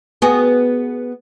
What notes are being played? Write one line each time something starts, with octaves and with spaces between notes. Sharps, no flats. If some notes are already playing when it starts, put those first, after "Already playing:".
B3 F#4 G#4